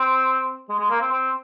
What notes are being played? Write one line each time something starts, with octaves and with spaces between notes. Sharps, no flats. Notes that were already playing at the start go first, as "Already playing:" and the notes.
Already playing: C4
G#3
G#3
A#3
C4
C4